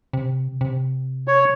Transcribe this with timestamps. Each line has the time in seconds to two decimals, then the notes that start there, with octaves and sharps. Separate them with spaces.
0.13 C3
0.61 C3
1.28 C#5